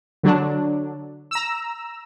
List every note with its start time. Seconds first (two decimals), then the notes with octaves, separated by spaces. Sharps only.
0.23 D3 F#3 D4
1.31 A#5 E6